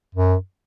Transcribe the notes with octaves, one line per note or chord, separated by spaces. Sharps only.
F#2